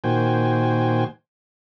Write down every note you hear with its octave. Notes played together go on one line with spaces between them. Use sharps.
A#2 D#3 F#4 C5 G5 G#5